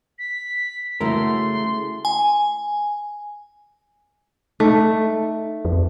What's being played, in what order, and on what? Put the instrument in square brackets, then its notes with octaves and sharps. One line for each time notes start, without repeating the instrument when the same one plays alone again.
[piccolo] B6
[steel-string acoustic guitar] C#3 A3 [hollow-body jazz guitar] E4 F#4 A#4 [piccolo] C6
[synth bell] G#5
[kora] A3 [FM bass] D#4
[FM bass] F2